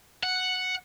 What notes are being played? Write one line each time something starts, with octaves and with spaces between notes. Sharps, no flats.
F#5